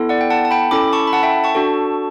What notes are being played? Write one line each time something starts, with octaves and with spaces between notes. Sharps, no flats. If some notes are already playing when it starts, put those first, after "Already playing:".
Already playing: B3 E4 A4
D5 F#5
G5
F#5 A5
A5
G5 B5
C#4 E4 A4 B5 D6
A5 C#6
B5
F#5 A5
E5 G5
A5 C#6
D4 F#4 A4